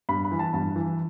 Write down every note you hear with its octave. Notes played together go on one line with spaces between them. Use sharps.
G2 B5
B5
E3
A5
G2 A5
E3